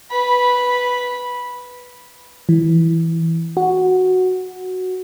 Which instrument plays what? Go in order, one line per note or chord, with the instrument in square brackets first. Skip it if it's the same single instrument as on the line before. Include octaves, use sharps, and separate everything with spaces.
[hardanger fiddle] B4 B5
[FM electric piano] E3
F#4